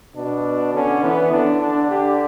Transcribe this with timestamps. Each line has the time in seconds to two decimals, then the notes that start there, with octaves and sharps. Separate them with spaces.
0.16 B2 D4
0.74 D3 C#4
1.03 E3 B3
1.32 D3 D4
1.61 D4
1.89 G4